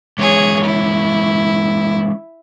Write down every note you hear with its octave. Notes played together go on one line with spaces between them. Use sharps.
E3 G#3 C#4 G#4 C#5
E4